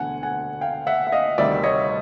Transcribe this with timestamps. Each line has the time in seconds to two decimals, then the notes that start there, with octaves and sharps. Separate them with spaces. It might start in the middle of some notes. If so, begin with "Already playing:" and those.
Already playing: E1 D2 D3 F#5 G#5
0.23 F#5 G#5
0.61 F5 G5
0.87 E5 F#5
1.07 E5
1.12 D#5 F5
1.38 D2 C3 D#3 G3 D5 E5
1.63 C#5 D#5